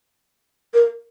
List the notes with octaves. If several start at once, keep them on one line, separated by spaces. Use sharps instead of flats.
A#4